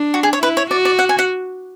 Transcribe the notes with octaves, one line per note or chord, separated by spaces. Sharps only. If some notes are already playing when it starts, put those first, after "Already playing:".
Already playing: D4
F#4
G#4
C#5
E4 B4
C#5
F#4 D5
D5
F#5
G#5
F#5